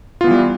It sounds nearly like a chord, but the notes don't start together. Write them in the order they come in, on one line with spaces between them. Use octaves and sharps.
F4 B3 E3 G3